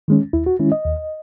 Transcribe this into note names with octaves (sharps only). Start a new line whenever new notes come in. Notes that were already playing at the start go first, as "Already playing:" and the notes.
D#3 G#3 C#4
D#2 E4
F#4
D#3 G#3 C#4 E4
D#5
D#2